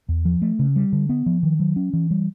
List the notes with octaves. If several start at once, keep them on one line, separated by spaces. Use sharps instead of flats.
E2
F3
A3
C#3
G3
D3
B3
F3
D#3
F#3
C#4
E3
G3